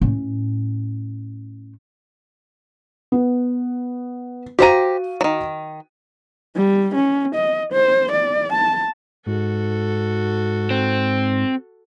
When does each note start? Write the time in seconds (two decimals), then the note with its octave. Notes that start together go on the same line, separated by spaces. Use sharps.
0.01 A2 C#4
3.12 B3
4.59 F#4 G4 C5 F5 A#5 D#7
5.21 D#3 F#3
6.56 G3
6.95 C#4
7.35 D#5
7.72 C5
8.11 D5
8.52 A5
9.26 G#2 F#4 A4
10.70 C4